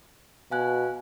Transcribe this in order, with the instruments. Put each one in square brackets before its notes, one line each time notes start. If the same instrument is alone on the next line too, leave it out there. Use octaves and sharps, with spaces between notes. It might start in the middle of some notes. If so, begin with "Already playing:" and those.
[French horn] B2 [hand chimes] F5 G#5 F#6